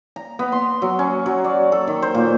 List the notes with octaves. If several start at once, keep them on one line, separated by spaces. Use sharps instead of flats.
A#5
B3
C6
F#3
C#4
F#3
D5
A4
D#3
C5
A#2